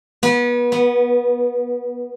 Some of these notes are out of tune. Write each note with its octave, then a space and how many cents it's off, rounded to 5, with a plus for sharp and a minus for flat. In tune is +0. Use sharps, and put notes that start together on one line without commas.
B3 -30
B3 -5